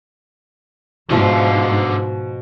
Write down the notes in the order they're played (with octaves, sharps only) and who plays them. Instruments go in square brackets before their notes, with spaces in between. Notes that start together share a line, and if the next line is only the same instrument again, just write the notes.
[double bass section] G#2 [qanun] B2 F3 E5 [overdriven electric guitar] D3 F4